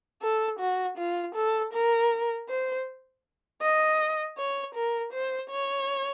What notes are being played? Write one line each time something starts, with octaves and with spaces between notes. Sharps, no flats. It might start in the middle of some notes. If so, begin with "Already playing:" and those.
A4
F#4
F4
A4
A#4
C5
D#5
C#5
A#4
C5
C#5